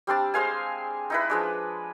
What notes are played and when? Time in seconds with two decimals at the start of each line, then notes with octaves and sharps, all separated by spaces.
0.07 G3 C4 D4 A5
0.34 G#3 C5 F5 G#5
1.10 D#4 E4 B4
1.30 F3 G#3 D4